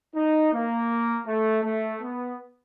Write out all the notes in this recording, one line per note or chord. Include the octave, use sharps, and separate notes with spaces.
D#4
A#3
A3
A3
B3